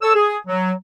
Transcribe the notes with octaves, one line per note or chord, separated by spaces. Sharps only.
A4 C#5 E6
G#4
F#3